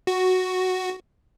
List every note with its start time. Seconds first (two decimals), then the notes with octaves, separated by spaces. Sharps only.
0.07 F#4